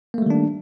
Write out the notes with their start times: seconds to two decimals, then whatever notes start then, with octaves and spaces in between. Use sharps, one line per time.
0.14 A#3
0.18 A3
0.22 G3
0.26 D#3
0.30 D4